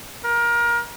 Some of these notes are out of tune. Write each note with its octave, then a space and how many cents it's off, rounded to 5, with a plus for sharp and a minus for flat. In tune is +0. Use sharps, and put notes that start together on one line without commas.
A#4 +25